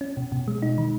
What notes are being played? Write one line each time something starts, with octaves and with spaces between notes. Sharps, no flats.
C#4
B2
B2
G#3
D#4
D#3